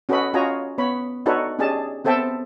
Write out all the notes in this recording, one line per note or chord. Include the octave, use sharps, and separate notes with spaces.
C#4 F#4 A4 B4 D#5 B5
C#4 F4 F#4 D#5 G#5 A#5
B3 C#5 B5
D4 D#4 F#4 A4 B4 C#5
C#4 D4 G4 G#4 D#5 A5
B3 C4 A4 E5 G5 A5